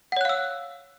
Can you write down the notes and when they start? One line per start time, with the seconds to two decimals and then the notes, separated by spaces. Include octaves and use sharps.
0.12 F#5
0.16 C#5
0.21 F#6
0.25 F5
0.29 E6